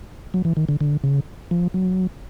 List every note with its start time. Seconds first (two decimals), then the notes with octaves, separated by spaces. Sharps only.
0.34 F#3
0.45 E3
0.57 D#3
0.69 D3
0.81 D3
1.04 C#3
1.51 F3
1.74 F#3